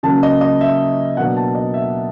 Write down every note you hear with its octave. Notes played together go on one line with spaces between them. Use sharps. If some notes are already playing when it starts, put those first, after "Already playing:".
C#3 F#3 A#3 C#4 A5
D#5
D#5
E5
B2 F#3 A#3 D4 F#5
A5
D#5
E5